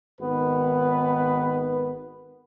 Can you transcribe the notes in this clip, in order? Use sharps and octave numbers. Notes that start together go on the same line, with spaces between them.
G#1 D#3 B3 B4